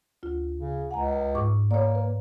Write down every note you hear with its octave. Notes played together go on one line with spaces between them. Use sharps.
D2 F4
C#3
C#2 F#5 G#5 A#5
G#2 C#6 D6
A#3 C#5 D5
B4